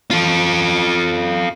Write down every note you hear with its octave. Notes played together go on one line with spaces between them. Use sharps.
F4 A4